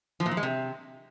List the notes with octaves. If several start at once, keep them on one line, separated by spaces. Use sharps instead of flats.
F3
A#2
F3
G#3
C3